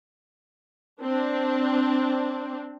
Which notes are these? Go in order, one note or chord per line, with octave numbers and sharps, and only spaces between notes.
C4 D4